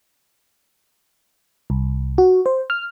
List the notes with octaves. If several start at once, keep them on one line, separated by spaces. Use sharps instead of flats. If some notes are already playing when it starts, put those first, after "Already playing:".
C2
F#4
C5
F6